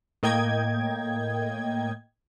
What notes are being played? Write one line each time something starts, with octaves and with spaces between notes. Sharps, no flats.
A2 A#3 D#5 G5 G#6